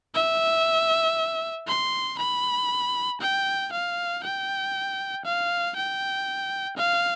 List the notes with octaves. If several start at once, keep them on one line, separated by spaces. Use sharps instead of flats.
E5
C6
B5
G5
F5
G5
F5
G5
F5